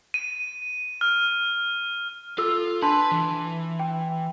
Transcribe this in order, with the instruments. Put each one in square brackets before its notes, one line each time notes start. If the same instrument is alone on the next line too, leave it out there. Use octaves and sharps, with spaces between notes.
[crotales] D#7
F6
[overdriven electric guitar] F4 [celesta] A4 E6
[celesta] D4 A5 C6 [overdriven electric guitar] B4 B5
[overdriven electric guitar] E3
[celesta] G5